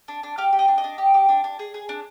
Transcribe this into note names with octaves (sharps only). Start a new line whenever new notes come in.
D4
D4
G4 F5
G4
D#5
D4
D#5
D4
G4
G4
D4
D4
G#4
G#4
D4